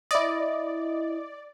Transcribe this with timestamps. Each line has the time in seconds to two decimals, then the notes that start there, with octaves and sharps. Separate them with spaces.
0.11 E4 D5 D#5